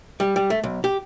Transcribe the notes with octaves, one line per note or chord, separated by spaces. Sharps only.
G3
G3
A3
B1
G4